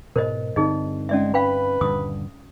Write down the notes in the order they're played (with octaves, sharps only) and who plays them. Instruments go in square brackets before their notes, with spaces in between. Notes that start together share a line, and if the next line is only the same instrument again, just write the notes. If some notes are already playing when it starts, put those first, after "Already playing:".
[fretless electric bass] G#2 B2 [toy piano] A#4 C5 D#5
[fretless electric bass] G2 D3 C4 [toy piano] D#4 G#4 D#5
[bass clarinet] G#3 [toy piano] C#4 D5 E5
[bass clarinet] B4 [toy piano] F5 G5 B5
[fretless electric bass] D#1 G2 D3 [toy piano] D#6